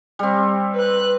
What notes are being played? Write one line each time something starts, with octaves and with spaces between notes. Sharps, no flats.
G3 C4
B4 F#6